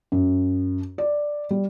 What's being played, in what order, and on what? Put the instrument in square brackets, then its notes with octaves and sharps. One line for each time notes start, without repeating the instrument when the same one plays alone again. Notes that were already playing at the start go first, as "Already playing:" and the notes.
[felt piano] F#2
D5
G3